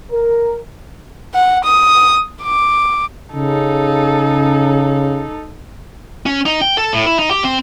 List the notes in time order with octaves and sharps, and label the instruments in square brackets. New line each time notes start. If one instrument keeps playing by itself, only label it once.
[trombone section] A#4
[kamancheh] F#5
D#6
D6
[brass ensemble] C#3 [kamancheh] D#4 A4
[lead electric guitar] C#4
D#4
G5
A4
A2
E4
D#4
G4
C4